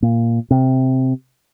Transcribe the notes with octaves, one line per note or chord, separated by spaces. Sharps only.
A#2
C3